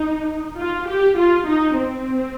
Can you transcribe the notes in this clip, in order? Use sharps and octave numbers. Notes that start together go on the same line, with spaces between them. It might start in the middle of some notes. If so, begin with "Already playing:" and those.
Already playing: D#4
F4
G4
F4
D#4
C4